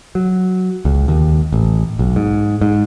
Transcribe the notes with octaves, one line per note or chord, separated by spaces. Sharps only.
F#3
C#2
D#2
A1
B1
G#2
G#2